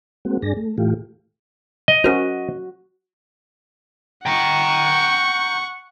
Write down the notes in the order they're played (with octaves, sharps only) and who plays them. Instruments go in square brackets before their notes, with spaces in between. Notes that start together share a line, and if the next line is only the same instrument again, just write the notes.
[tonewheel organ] G#3 A#3 C4 F#4
G2 D4 G#4 A#6
A3
A2 E3 A3 F4 G4
[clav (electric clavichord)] D#5
[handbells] C#4 A#4 C5 [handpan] F#4
[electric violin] F#5 C#6 [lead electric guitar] G5 A#5